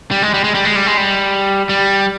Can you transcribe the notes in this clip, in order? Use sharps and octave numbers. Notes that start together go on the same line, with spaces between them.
G3
G#3
G3
G#3
G3
G#3
G3
G#3
G3
G3